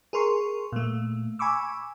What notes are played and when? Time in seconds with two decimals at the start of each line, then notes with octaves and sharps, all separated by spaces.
0.13 G#4 A#4 C6 C#6
0.72 A#2 A3
1.39 G#5 B5 C#6 D6 E6